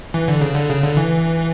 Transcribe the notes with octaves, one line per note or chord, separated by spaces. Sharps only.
E3
D3
C#3
D3
C#3
D3
E3